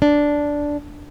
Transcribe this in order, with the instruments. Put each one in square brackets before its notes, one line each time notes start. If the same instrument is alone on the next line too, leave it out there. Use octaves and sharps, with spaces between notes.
[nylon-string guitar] D4